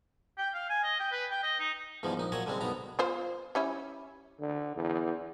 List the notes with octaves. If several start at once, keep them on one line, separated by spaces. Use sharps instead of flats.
G5
F5
G#5
D#5
G5
B4
G5
D#5
D#4
E2 G#2 F3 G3
A#1 D#4
A#2 F#3 C#5 D#5 F#5 C#6
D3 G3 G#3 C4
B1 G2 B3 A#5
B3 F4 C5
G3 C#4 E4
D3
E2